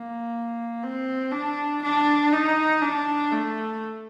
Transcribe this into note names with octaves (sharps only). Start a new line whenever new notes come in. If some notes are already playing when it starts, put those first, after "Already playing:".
Already playing: A#3
C4
D4
D4
D#4
D4
A3